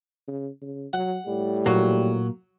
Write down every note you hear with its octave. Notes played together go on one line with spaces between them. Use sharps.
C#3
C#3
F#3 F#5
A2 G3
A#2 F#3 A#3